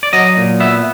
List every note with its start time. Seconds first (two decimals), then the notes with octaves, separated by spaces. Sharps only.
0.03 D5
0.13 F#3 D#5
0.37 A#2
0.60 B3 E5